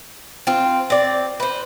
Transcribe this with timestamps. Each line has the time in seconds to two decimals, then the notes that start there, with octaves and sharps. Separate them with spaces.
0.47 C4 F4
0.90 C4 D5
1.40 B4 C5